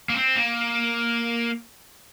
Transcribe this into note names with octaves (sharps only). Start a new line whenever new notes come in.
A#3
C4
A#3